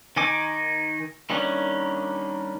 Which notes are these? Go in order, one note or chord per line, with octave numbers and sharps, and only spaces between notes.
D#3 D#4 G#5 D6
D#3 G3 A#3 C#4 D4